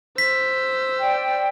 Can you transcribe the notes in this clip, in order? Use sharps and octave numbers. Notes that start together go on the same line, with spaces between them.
C5 E6 B6
D5 G5